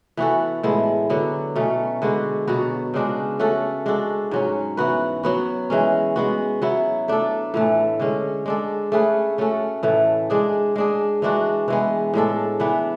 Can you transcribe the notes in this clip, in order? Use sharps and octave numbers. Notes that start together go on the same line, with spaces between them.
E3 B3 F#4 A4
A2 G#3 B3 E4
D3 F#3 B3
B2 A3 C#4
D3 G#3 B3 F#4
B2 F#3 B3 F#4
C#3 G#3 D4 F#4
A3 C#4 F#4 A4
G#3 D4 F#4 A4
G#2 F#3 C#4
E3 B3 F#4 B4
F#3 B3 F#4
E3 G#3 C#4
G#3 B3 F#4
F#3 B3 E4
A3 D4 A4
A2 E3 A3
D3 G#3 C#4
G#3 D4 A4
A3 C#4 G#4 B4
A3 C#4 F#4 A4
A2 E3 A3
G#3 D4 G#4
G#3 D4 G#4
E3 G#3 D4 F#4
E3 G#3 B3
A2 G#3 D4 A4
E3 B3 D4